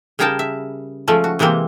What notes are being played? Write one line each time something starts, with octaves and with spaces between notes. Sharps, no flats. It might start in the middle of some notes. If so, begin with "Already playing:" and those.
C#3 G3 G#4 A#4 G5 A5
E5
F3 G#3 A3 C#4
F#4
C3 E3 G#3 A#3 C4